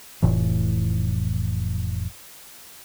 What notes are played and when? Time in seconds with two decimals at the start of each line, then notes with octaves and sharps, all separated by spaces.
0.22 F1 A2 E3